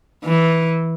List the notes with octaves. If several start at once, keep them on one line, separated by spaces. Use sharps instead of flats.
E3